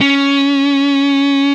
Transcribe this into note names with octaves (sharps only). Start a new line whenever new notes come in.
C#4